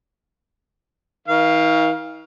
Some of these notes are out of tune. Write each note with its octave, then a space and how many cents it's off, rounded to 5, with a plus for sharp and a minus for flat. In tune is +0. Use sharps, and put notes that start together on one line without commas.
D#3 +45 F5 +0